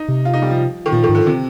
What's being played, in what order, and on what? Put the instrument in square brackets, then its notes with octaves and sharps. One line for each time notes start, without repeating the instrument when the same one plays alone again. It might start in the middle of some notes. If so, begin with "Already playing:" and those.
Already playing: [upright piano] D#4
[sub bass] C3
[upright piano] F4
D#4
G3
F3
D#3
[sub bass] A#2 [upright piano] F3
[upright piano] D#3
[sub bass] G#2
[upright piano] D3
C3